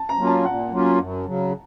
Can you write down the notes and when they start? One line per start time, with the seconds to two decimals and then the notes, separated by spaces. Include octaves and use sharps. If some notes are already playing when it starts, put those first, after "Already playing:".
Already playing: A5
0.09 A#5
0.17 F#3 A#3 C#4 F4
0.27 A5
0.45 A#2 F#5
0.71 F#3 A#3 C#4 F4
0.98 F#2
1.26 C#3 F#3